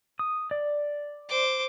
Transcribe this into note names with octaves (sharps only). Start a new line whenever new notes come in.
D#6
D5
C5 D6